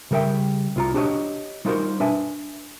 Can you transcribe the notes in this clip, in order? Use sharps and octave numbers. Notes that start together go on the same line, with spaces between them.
C#3 G3 A#4 E5 G5
C2 F4 A#5
D4 F#4 G4 B4 C#5 D#5
G3 D#4 F4 F#4 A#4 C5
D4 B4 E5 G#5